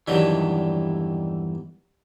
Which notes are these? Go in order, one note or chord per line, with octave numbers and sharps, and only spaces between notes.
E2 G2 D#3 E3 F#3 G3